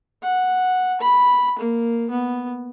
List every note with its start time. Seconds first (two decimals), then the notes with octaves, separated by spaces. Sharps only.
0.23 F#5
1.01 B5
1.59 A#3
2.10 B3